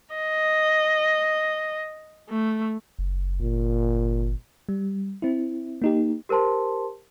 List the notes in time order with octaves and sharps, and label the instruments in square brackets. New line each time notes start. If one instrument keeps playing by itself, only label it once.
[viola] D#5
A3
[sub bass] F#1
[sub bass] G1 [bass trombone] A#2
[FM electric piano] G3
C4 E4
A#3 D#4 G4
[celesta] G4 A#4 C5 A5 C6